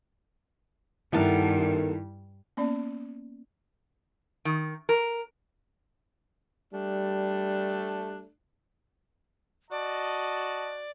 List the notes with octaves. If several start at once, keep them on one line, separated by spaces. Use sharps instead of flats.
G2 D#3 B3 E4 A4 A#4
A#3 B3 C#4 D5
D#3
A#4
G3 A3 D4
F#4 D5 D#5 A5